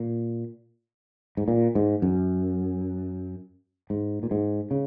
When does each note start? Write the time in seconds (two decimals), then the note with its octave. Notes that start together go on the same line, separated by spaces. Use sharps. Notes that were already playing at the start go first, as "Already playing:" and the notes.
Already playing: A#2
1.37 G#2
1.48 A#2
1.75 G#2
2.02 F#2
3.90 G#2
4.23 A#2
4.31 G#2
4.71 C#3